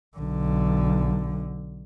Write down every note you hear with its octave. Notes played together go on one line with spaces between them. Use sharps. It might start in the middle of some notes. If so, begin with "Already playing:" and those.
B1 D3